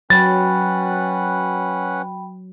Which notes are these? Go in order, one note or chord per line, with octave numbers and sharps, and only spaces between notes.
F#3 C#4 B4 F#5 G5 B5 A6